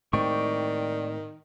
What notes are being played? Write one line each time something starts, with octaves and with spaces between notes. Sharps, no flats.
A2 D#3 G#3 C4 D5 G5 C#6